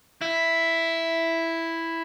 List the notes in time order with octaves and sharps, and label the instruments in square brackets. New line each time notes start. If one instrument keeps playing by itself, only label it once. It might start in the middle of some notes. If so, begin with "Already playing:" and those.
[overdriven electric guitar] E4